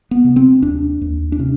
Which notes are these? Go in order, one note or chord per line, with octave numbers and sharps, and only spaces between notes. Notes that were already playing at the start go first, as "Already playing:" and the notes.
B3
C3
C4
D#2 D4
D#2
D4
C3 C#4